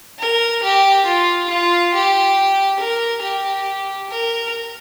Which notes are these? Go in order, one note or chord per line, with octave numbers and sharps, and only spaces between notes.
A#4
G4
F4
F4
G4
A#4
G4
A#4